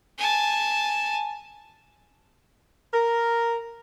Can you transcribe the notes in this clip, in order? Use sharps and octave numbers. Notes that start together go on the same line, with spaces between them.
G#5 A5
A#4